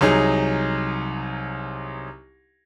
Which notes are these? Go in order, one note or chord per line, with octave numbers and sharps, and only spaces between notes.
C2 F#3 D#4 G#4